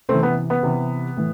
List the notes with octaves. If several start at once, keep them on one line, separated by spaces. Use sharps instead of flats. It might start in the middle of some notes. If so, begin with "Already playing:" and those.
C3 E3 A3 C4
B3
B3
C3 E3
A2 E3